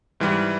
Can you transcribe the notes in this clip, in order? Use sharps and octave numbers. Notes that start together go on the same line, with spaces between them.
G#2 E3 G3